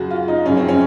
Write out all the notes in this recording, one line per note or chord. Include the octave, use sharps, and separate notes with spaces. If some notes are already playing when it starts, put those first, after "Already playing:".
Already playing: F#2 C#3 F#3 F#4
F4
D#4
F#2 C#3 F3 C#4
C4
C#4